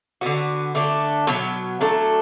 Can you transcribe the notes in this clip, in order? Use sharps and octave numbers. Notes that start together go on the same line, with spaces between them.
D3 B3 F#4
D3 A3 D4
B2 F#3 B3
F#3 A3 D4 A4